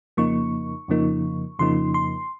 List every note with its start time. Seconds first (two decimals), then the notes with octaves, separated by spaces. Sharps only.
0.17 F2 C#3 F3 A#3 D#4 C#6
0.88 F2 C#3 F3 A#3 D#4
1.59 F2 C#3 F3 A#3 D#4 C6
1.94 C6